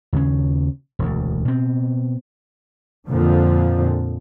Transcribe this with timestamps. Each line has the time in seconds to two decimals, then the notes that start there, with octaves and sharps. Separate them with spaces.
0.13 D#2 C#3 C#4
0.99 E1 D2
1.45 B2 C4
3.09 F2 A#2 D3 F3